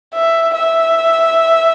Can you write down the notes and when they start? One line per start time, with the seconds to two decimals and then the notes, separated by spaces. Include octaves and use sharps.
0.14 E5
0.54 E5